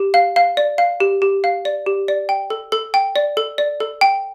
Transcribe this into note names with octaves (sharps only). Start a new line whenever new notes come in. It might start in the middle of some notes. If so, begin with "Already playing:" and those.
Already playing: G4
F5
F5
D5
F5
G4
G4
F5
D5
G4
D5
G5
A4
A4
G5
D5
A4
D5
A4
G5